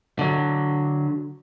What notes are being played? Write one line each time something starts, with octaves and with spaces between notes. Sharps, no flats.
D3 F#3